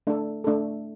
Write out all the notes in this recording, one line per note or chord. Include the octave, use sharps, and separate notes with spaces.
A3 D4 A4
A3 D4 A4